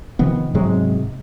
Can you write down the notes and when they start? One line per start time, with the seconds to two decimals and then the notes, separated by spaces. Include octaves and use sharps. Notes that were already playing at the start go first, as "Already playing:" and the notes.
0.19 C3 D#3 F3 B3
0.54 G#2 C3 F#3 G#3